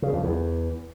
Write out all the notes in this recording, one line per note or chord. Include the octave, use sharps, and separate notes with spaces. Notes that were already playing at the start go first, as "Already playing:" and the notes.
C#3
F2
E2